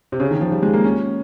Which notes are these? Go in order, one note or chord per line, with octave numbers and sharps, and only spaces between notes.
C3
C#3
D#3
F3
G3
G#3
A#3
C#4